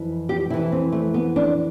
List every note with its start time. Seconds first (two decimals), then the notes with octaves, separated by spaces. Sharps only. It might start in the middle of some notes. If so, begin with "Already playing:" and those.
Already playing: F2 E3
0.29 G4
0.50 F2 E4
0.54 E3
0.72 C4
0.92 A3
1.14 B3
1.36 D4